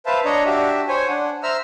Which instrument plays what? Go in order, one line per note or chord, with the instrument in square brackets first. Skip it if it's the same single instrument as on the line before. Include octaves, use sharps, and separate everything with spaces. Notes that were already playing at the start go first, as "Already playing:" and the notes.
[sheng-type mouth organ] B4 C5 E5 F5 A5
D4 C#5 D#5 A#5
D4 F#4 G4 E5
C5 C#5 G#5
D4 F#5
C5 E5 A#5 E6 F6